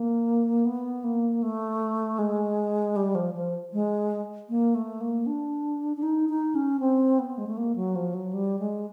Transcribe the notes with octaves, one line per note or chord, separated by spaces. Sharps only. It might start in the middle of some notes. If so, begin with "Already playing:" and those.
Already playing: A#3
B3
A#3
A3
G#3
G3
F3
F3
G#3
A#3
A3
A#3
D4
D4
D#4
D#4
C#4
C4
B3
G#3
A3
A#3
F#3
F3
F#3
G3
G#3